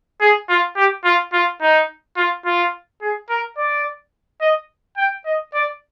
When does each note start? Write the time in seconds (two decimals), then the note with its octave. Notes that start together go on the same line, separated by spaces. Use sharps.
0.21 G#4
0.49 F4
0.76 G4
1.04 F4
1.33 F4
1.61 D#4
2.17 F4
2.46 F4
3.01 G#4
3.29 A#4
3.57 D5
4.41 D#5
4.97 G5
5.25 D#5
5.54 D5